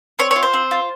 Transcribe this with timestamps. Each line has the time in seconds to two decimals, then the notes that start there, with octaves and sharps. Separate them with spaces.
0.19 C4 C#5
0.31 F4 C#5
0.43 C5
0.53 C4
0.71 F4